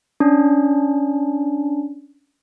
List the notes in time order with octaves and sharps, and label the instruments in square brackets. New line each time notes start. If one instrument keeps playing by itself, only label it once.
[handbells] C#4 D4